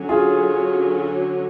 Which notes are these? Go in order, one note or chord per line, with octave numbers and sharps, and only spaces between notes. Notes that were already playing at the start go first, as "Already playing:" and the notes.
Already playing: D3 F#3 C#4
F4 G#4